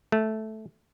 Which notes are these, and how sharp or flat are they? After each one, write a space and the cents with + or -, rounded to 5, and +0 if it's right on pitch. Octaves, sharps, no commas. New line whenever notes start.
A3 -10